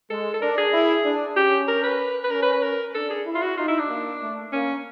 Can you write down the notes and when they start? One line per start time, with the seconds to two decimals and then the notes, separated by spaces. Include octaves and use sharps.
0.10 G#3 A4
0.34 A4
0.41 D4 A#4
0.58 G#4
0.73 E4
1.04 D4
1.36 C#4 G4
1.68 A#4
1.83 B4
2.24 B4
2.31 C#4 A#4
2.42 B4
2.53 B4
2.63 A#4
2.95 D4 A4
3.10 G#4
3.26 E4
3.35 F4
3.42 F#4
3.57 D#4 F4
3.68 E4
3.79 D4
3.89 A#3
4.21 A3
4.53 A#3 C#4